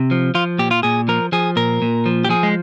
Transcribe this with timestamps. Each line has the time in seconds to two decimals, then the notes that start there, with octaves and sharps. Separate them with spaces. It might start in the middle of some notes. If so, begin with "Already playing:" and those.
Already playing: C3
0.11 F3
0.35 F3 F4
0.59 A#2 G4
0.71 F4
0.83 A#2 G#4
1.08 F3 A#4
1.32 F3 G#4
1.56 A#2 A#4
1.82 A#2
2.06 F3
2.25 G4
2.29 F3 G#4
2.43 G#3